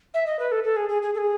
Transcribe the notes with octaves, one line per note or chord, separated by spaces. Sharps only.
E5
D#5
B4
A4
A4
G#4
G#4
G#4
A4
G#4